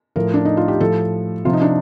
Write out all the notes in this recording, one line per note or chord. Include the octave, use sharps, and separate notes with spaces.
A2 F3 A#4
D4
D#4
F4
G4
A2 F3 A4
C3 F3 F4
D#4
D4